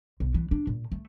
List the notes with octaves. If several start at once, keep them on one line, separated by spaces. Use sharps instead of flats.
B1
E3
D4
A#2
A3